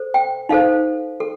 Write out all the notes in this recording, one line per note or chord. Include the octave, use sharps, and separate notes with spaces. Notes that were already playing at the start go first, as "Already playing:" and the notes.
Already playing: A4 C5
G5
D#4 A4 C5 F5
A4